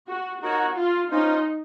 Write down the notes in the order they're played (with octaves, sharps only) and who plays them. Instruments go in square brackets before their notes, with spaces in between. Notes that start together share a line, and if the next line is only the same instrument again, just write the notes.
[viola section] F#4
[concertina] D#4 A#4 C#5 [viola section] F#4
[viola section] F4
[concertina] C#4 F4 C5 [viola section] D#4